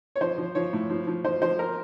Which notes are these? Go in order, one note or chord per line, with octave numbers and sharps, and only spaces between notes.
C#5
F3 C5
F3
F3 C#5
A2
F3
F3
F3 C5
F3 C5
A#4